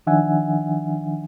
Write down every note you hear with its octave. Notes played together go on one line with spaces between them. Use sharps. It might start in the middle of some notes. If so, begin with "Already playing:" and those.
D#3 F3 D4 E5 F#5 G#5